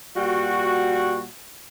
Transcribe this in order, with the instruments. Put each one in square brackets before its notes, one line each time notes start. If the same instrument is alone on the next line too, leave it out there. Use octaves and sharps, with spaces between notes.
[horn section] A#2 G3 F#4